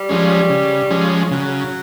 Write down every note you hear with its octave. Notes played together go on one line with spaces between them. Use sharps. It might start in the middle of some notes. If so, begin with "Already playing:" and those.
Already playing: G3
F3 G#3 C#4
C#3
F3 G#3 C#4
C#3 F#3